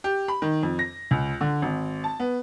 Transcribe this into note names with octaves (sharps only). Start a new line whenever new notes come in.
G4
B5
D#3
F2
A#6
C#2
D3
G#1
A5
B3